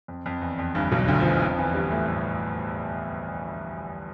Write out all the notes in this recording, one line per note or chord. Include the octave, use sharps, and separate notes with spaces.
F2
F2
E2
F2
G1 G2
B1 B2
D2 D3
F3
E2 E3
F2 F3
E2 E3
G2 G3
A2 A3
A2 A3